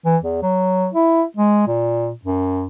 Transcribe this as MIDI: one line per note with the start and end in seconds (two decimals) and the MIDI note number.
0.06 0.17 52
0.23 0.38 40
0.42 0.87 54
0.94 1.23 64
1.37 1.67 56
1.67 2.10 46
2.25 2.68 42